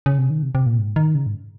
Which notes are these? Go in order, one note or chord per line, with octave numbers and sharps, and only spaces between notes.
C#3
C3
D#3
C3
C3
A#2
G#2
D#3
C#3
G#2